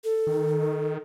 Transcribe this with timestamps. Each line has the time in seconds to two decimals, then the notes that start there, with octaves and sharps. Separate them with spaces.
0.04 A4
0.27 D#3